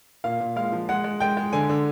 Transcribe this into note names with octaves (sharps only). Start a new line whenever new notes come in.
A#2 F5
A#2
G#3 F5
F3
G#3 F#5
G#3
G#3 G5
G#3
D3 G#5
D3